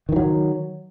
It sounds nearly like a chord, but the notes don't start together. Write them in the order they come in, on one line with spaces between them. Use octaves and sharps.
D#3 E3 F#3